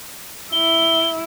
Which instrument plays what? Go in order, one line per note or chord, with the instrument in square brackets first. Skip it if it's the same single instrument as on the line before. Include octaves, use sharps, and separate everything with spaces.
[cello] E4 [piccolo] G7